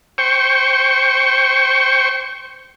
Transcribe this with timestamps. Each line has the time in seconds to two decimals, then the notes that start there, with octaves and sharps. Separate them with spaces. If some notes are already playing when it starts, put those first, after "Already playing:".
0.18 C5 G5 C#6